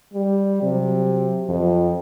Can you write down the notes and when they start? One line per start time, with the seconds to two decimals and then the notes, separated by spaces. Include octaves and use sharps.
0.14 G3
0.62 C3 F#3
1.49 F2 F3